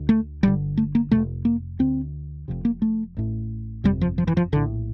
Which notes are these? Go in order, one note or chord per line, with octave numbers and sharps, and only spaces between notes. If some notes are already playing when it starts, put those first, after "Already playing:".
Already playing: D2 D3
A3
G1 G2 D3 G3
A3
A#3
F1 F2 C3 A3
A#3
D2 D3 C4
F1 F2 C3
A#3
A3
A1 A2
G1 F2 C3 G3
F3
F3
E3
F3
A#1 A2 D3